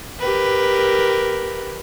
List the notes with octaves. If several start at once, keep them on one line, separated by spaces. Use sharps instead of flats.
G4 A#4 B4